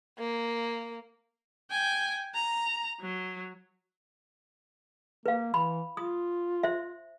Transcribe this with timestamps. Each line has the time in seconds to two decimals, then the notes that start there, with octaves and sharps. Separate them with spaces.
0.19 A#3
1.71 G5 G#5
2.34 A#5
3.01 F#3
5.26 A#3 B4 F5
5.54 E3 B5
5.97 F4 D#6
6.63 C5 E5